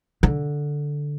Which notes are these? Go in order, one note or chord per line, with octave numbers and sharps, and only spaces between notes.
D3